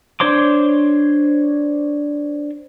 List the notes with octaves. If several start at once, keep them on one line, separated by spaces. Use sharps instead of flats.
D4 C5 C#5 C6 D6